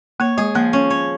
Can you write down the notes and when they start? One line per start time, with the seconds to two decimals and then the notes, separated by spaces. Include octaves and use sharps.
0.20 A#3 C#5
0.37 G#3 G#4
0.55 F3 A#3
0.73 C#4
0.90 C#5